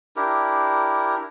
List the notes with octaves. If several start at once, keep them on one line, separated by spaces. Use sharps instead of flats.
D4 E4 G4 A#4